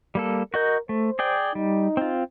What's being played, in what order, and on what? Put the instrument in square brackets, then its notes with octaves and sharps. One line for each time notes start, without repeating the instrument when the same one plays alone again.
[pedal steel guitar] G3 A#3 A4
[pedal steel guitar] F#4 D#5 G6 [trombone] A#4
[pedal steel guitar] A3 [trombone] C5
[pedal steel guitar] G#4 D5 G5
[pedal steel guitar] G3 [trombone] D#4
[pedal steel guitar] C4 F4